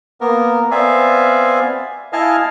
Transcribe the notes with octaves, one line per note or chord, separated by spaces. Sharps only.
A#3 B3 A#4
B3 C4 D5 E5 F5 G#5
E4 D#5 F5 G#5 A5 F6